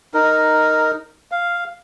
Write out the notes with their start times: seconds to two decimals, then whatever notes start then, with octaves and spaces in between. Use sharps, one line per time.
0.14 D#4 A#4
1.32 F5